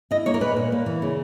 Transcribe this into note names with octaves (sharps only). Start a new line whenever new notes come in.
E4 D#5
A#3 C#5
A#4
A#2 B4
A#2
A#3
E3
C#3